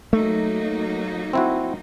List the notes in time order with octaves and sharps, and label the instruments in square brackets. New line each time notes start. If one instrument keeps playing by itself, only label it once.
[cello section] F#3 A#3 D#4 [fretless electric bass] A3
[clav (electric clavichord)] C4 E4 F#4